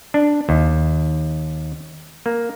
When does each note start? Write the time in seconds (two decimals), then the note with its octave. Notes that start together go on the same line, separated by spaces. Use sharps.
0.14 D4
0.49 D#2
2.26 A#3